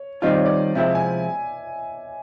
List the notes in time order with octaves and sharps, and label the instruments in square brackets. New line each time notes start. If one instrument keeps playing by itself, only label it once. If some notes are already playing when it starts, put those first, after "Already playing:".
Already playing: [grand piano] C#5
[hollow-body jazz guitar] D#3 G3 C4 F4 [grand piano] D#5
[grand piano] D5
C#5
D5
[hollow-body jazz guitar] C3 F3 G#3 C4 E4 [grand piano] E5
[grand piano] G#5